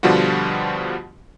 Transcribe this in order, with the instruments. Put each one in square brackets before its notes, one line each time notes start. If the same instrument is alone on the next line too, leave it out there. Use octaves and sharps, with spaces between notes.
[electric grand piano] B2 D3 F3 G3 F4 F#4